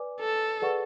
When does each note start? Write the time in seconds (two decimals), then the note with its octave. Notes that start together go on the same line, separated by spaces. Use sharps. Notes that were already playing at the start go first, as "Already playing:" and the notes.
Already playing: B4 D5 G#5 D6
0.20 A4
0.62 G#4 B4 D5 F#5 C#6